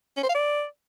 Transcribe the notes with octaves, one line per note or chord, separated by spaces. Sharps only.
C#4
C5
F5
D5